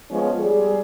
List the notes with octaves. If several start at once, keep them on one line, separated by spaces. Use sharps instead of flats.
F3 G#3 B3 C#4
G3 G#4